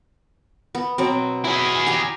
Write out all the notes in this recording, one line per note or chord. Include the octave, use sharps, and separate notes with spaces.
B3
B2 F#3 C4
E4 G#4 D#5
G4 G#5 A#5